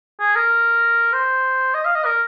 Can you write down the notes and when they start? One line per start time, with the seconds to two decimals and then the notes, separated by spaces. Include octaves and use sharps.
0.20 G#4
0.36 A#4
1.13 C5
1.74 D#5
1.85 F5
1.95 D#5
2.05 A#4